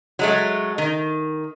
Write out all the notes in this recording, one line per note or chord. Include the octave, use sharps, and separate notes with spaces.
F#3 G#3 A3
D#3